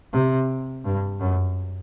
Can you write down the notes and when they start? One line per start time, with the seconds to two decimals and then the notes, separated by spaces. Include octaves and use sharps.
0.13 C3
0.85 G2
1.21 F#2